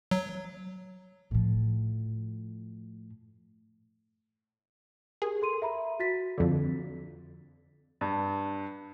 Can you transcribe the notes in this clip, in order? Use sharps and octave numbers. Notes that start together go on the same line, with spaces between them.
F#3
A2 F3
G4 G#4 A#4
A4 C6 D#7
E5 A#5 B5
F#4 A6 B6
F2 D3
G2